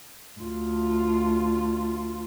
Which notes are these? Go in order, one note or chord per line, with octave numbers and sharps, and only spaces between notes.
D2 F4